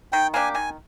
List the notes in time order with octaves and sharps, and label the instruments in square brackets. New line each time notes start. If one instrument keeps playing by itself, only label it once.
[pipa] D#3 [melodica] G5
[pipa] A#3 D4 G4 [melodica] G#5
[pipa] D#3 [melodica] G#5